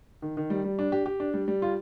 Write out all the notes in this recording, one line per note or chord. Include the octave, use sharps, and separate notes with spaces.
D#3
D#3
G3
G3
D4
G4
G4
D4
G3
G3
F4